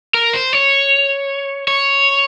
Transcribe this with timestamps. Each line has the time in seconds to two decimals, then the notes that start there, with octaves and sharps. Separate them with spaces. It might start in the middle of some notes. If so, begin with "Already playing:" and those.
0.14 A#4
0.33 C5
0.53 C#5
1.68 C#5